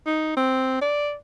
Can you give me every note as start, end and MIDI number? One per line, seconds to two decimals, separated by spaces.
0.06 0.34 63
0.37 0.78 60
0.82 1.14 74